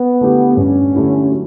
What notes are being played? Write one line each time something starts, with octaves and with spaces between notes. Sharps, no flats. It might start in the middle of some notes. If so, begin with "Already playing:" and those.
Already playing: B3
D3 A3 E4 G4
G2 C#4
D3 A3 E4 G4
F#3